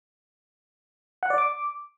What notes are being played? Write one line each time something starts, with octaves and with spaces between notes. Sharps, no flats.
F#5
D5
D6